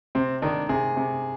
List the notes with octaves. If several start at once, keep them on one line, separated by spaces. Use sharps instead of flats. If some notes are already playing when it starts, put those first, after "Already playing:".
C3 C4
D#3 D4
C3 G#4
C3